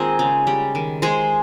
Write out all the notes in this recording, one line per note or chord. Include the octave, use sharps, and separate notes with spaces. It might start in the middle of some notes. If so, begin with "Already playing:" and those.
Already playing: D#3 G#3 A#3 C4 D#4 F4 G#4 C5
C#3
G3
D#3
G#3 G#4 C5